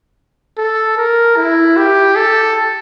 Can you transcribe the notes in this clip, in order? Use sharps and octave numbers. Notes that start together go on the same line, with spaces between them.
A4
A#4
E4
G4
A4